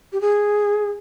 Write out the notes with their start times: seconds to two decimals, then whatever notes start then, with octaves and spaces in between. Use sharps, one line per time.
0.12 G4
0.21 G#4